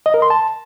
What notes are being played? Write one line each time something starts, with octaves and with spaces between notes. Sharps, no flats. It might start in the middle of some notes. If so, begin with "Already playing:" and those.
D#5
A#4
C6
A5